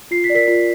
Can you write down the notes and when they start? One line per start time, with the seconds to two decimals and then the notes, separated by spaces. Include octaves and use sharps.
0.11 F4 C7
0.24 B6
0.30 D5
0.35 A#4 B6
0.48 F4